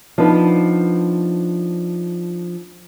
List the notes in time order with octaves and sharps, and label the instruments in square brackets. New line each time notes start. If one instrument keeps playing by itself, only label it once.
[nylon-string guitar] F3 B3 D4 D#4 B4